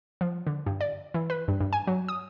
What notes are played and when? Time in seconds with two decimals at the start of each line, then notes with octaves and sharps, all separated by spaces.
0.21 F3
0.47 D3
0.66 G2
0.81 D5
1.14 E3
1.30 B4
1.48 G2
1.61 G2
1.73 G#5
1.87 F#3
2.09 D#6